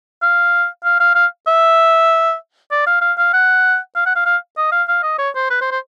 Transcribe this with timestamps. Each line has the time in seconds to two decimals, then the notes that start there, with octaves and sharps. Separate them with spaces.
0.22 F5
0.84 F5
1.00 F5
1.15 F5
1.47 E5
2.71 D5
2.87 F5
3.01 F5
3.18 F5
3.34 F#5
3.96 F5
4.06 F#5
4.15 F5
4.26 F5
4.58 D#5
4.72 F5
4.88 F5
5.03 D#5
5.19 C#5
5.35 C5
5.50 B4
5.61 C5
5.71 C5